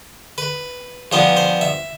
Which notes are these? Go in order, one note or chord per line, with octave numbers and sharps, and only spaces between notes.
B4
G2 F3 B3 C5
C5
E5